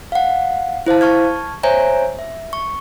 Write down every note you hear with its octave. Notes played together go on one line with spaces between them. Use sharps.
F5 F#5
E4 C5 F5 A5
A5 C#6 F6 G#6
C5 C#5 E5 G#5 A#5
E5
C#6